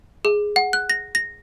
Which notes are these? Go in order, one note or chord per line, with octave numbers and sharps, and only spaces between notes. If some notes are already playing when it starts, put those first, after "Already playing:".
G#4
F#5
F#6
A#6
A#6